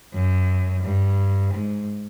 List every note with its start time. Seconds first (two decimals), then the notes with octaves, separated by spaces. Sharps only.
0.14 F#2
0.84 G2
1.53 G#2